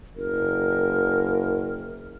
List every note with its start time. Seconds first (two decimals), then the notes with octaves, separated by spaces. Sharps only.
0.16 F#1 A#4